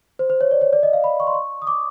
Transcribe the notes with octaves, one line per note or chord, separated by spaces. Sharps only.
C5
C5
C#5
D5
C#5
D5
D#5
F5
B5
C#6
C6
C#6
D#6
D6